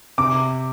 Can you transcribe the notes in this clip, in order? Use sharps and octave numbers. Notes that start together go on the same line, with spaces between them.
C3 D6